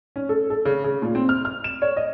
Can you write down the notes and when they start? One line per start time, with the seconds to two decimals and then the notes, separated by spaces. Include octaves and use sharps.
0.16 C#4
0.29 A4
0.50 A4
0.65 C#3
0.84 C#3
1.02 A#2
1.15 C4
1.29 F6
1.45 F6
1.64 E7
1.82 C#5
1.97 D#5